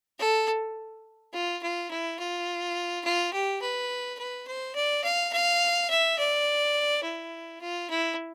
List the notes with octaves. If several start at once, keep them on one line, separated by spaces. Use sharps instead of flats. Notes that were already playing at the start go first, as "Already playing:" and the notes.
A4
F4
F4
E4
F4
F4
G4
B4
B4
C5
D5
F5
F5
E5
D5
E4
F4
E4